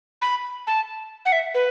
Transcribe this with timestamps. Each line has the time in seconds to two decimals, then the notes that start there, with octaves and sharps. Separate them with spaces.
0.22 B5
0.67 A5
1.25 F#5
1.32 E5
1.54 B4